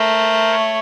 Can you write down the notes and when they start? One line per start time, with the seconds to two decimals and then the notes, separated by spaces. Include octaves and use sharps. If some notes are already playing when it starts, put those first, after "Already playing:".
Already playing: A3 A#4 C5
0.51 C#5